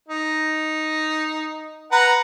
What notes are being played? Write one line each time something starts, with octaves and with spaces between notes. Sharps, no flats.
D#4
B4 F#5 A#5